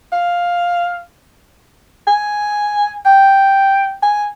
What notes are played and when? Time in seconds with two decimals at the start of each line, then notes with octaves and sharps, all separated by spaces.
0.13 F5
2.07 G#5
3.06 G5
4.03 G#5